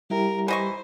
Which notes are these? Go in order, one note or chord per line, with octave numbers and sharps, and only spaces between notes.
G3 E4 G4 A#4
E3 C5 D#5 C#6